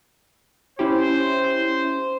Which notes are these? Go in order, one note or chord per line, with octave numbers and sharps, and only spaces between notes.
C#4 E4 G4 C5